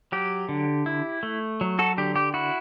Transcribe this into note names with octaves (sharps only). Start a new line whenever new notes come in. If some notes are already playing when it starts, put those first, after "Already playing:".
F#3 G4
D3
E4
A3
F#3
F#4 A4
D3 G4
G4
E4 F#4